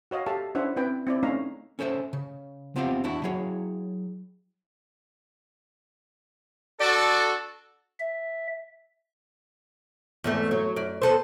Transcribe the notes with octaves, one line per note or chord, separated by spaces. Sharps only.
F#4 C#5 D#5 F5
G4 A4 E5 F5 A5
C#4 D4 E4 C5 E5 F#5
C4 E4 B4 G5
C4 E4 D5
A3 C#4 D#4 C#5 F5 A#5
C#4 A4 C5 C#5 E5
C#3
B3 C4 F4 G4 E5 F5
E2 D4 E4 F#4
F#3 E4 G#4 C#5
D4 F#4 A4 D5
E5
E2 G#2 A3
F#3
F#2 D5
B3 A4 C5